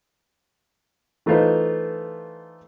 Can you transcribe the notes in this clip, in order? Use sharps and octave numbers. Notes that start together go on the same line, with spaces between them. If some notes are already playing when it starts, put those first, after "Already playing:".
E3 A3 D#4 F4 B4 C5